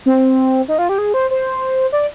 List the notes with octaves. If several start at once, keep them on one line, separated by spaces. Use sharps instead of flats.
C4
D#4
F4
G4
G#4
C5
C5
D5